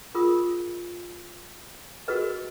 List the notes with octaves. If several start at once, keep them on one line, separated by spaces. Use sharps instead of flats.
F4 G#4 A#4 D#6
F#4 G#4 A#4 B4 D#5